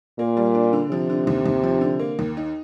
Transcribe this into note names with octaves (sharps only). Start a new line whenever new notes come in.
A#2 A#3
G3
D4
D3
C3 F3
D3
D#2
D#2
F3
D3
A#3
D#2
D#4